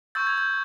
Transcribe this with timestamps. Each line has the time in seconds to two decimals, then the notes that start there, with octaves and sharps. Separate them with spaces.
0.15 C#6 E6 G6 A6
0.27 G#6
0.38 G6